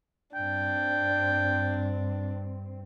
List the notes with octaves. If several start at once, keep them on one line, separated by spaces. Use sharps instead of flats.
G2 C4 D4 G5